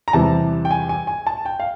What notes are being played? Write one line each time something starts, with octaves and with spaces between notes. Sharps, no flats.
A#5
E2 C3 E3 G3 A5
G5
G#5
G#5
G#5
A5
G5
F5